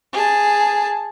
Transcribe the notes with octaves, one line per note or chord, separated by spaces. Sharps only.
G#4 A5